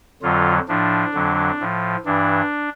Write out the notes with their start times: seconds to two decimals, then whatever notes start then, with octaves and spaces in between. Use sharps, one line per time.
0.23 F2 D3 F#3 F4
0.68 A2 F3 D4
1.14 F2 D3 F#3
1.59 A2 F3
2.05 G2 E3 D4